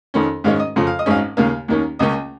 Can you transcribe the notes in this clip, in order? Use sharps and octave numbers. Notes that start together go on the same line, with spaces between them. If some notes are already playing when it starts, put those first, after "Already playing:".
F2 D#3 C#4
G#2 D#3 G#3 C#4 F5
D#5
F2 C#3 F3
F5
D#5
G#1 G#2 G#3 C#4 F5
D#2 C#3 A#3 F5
D#2 D#3 A#3 C#4
C#2 C#3 A#3 C#4 D#5